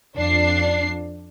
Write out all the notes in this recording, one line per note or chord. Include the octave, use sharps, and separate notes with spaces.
F2 D4 C7